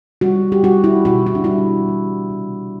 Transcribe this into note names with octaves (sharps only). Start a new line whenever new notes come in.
G3 F#4
G4
G3 F#4
E4
B2 F#4
E4
D4
G3 E4
G3
C3